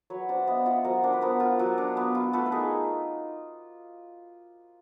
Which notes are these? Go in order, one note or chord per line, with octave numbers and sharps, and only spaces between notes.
F#3 B4 C#5
D4 C5 D5
E5
B3 D#5 F5
F4 E5 F#5
F#3 A#4 C5
D4 A#4 C5
B4
B3 A#4 C5
F4
F#3
D4
B3
F4
A3 A4 B4
B4
D#4 G#4 A#4